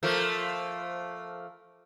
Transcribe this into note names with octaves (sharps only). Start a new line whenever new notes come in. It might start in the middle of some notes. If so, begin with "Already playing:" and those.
F3 A3 A#3